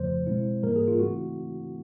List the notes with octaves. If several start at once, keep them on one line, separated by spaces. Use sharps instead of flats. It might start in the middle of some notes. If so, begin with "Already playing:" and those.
Already playing: F2 C#3 F3 A3 C5
B2 G#3 C4 E4
G#2 E3 G3 A#3 A#4
G#4
F4
C#3 E3 A3 C4 E4 F#4